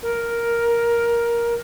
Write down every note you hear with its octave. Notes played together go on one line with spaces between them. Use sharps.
A#4